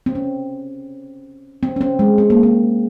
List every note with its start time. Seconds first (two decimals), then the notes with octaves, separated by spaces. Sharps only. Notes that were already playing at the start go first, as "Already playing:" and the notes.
0.06 C4
0.15 C#4
1.63 C4
1.76 C#4
1.81 C4
1.99 G#3
2.18 C4
2.30 A#3
2.43 C4